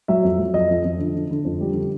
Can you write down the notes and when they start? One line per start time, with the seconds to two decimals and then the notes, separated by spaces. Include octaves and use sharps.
0.08 F#3 E5
0.24 F2
0.39 F#3
0.54 F2 D#5
0.70 F2
0.84 F2
0.99 D3
1.15 D3
1.31 D3
1.45 F2
1.61 G3
1.76 D3